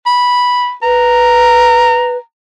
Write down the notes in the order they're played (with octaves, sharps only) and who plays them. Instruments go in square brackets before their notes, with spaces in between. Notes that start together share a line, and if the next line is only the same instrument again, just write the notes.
[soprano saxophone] B5
[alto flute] B4 [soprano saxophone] A#5